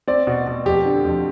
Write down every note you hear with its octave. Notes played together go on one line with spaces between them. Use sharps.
C4 D5
B2
B2
F2 G4
D3
F2